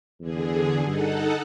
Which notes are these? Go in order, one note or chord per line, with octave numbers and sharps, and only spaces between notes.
E2 D3 G#4
G2 D#4 A4 F#5